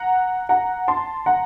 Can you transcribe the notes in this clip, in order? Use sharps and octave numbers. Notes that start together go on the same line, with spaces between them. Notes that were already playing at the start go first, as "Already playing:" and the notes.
Already playing: F#5 A#5
F#5 A#5
A5 C6
F#5 A#5